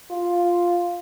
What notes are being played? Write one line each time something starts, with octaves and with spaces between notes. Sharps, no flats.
F4